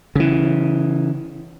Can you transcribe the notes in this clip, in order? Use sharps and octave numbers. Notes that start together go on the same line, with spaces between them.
C#3 E3